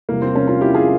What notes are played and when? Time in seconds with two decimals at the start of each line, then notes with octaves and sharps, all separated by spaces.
0.09 E2 C3 G3 A#3
0.22 C4
0.36 A#3 C#4
0.48 C#4 F4
0.61 E4 G4
0.75 F4 G#4